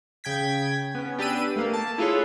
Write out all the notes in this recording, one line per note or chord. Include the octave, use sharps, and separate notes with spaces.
C#3 G5 G#6 B6
B3 C#4
D4 G4 B4 E6 D#7
A3 A#3
A5
E4 F4 G#4 A4 B4 C#5